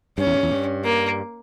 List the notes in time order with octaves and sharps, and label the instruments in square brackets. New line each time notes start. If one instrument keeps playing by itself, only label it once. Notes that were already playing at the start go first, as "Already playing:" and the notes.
[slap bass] G2 [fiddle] C#4
[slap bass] E2
G2
E2
G2
[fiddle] A#3